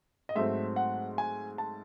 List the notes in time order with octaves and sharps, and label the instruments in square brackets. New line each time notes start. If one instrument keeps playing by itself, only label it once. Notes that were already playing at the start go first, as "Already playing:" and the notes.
[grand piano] D#5
G#2 F#3 A3 C4 E5
F#5
G#5
A5